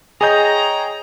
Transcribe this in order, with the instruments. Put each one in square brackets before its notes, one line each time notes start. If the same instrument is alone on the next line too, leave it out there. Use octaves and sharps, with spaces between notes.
[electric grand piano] G#4 D#6 G6 [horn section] C#5 G5 A#5 [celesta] D#5 G#5